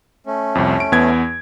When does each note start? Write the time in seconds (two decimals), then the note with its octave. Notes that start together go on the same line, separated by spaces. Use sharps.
0.26 A3 C#4
0.55 C2 F2
0.80 D7
0.92 E2 B3 G#6